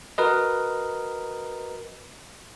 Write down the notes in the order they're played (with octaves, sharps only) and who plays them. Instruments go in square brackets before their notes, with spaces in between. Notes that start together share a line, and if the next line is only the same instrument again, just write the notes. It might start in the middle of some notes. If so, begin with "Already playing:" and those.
[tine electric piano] F#4 A#4 B4 D#5